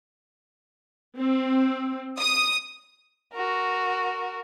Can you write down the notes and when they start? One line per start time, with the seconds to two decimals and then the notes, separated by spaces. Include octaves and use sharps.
1.17 C4
2.19 D#6
3.34 F#4 A#4